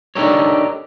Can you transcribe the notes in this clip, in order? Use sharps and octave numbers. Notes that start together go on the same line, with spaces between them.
D4 D#4 G4 A4 A#4 C#5